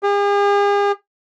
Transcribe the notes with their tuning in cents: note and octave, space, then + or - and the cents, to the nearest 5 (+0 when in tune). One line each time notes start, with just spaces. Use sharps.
G#4 -45